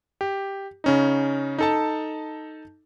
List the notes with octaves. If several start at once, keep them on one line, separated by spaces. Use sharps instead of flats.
G4
C#3 C#4 D#4
D#4 A4 A5